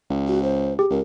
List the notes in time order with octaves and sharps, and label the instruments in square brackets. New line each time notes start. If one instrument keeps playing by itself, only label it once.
[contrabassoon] C#2
[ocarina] F#4
C5
[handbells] G4 [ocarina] G#4
[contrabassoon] C#2 [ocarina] A#4